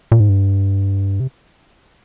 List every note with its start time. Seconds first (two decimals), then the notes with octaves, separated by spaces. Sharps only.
0.12 A#2
0.20 G#2
0.29 G2
1.20 C3